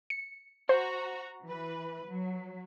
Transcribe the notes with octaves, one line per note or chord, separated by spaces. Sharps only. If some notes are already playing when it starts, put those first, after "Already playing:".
C#7
F#4 C5 A#5
E3 B4
F#3